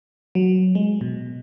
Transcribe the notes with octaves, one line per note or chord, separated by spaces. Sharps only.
F#3
G#3
B2